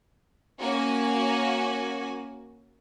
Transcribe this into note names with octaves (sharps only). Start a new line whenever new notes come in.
A#3 C#4 F#4 G#5